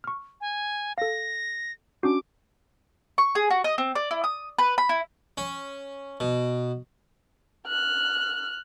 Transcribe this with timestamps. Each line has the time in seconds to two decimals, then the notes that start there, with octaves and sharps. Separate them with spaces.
0.04 C#6 F6
0.41 G#5
0.98 A4 F5 A#6
2.03 C#4 D4 F#4 D6
3.18 C#6
3.35 G#4
3.50 F#4
3.64 D#5
3.78 C4
3.95 D5
4.11 E4
4.24 D#6
4.58 B4
4.78 B5
4.89 E4
5.37 C#4
6.20 B2
7.67 F6 F#6